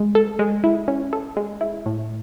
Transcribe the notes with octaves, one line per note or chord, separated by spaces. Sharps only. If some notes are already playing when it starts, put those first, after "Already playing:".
Already playing: G#3
A4
G#3
E4
C#4
A4
G#3
E4
A2